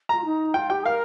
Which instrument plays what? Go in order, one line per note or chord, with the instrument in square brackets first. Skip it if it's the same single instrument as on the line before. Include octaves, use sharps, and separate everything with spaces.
[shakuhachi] F4 [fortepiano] A#5
[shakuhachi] D#4
[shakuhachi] F4 [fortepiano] G5
[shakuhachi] G4 [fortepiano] G5
[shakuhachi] A#4 [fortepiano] F5